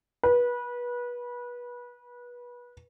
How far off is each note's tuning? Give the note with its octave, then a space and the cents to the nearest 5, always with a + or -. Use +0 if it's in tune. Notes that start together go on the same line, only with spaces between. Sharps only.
B4 -25